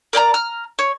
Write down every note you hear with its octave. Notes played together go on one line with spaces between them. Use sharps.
A#4 D5 G5 A#5
A#5 F6
C#5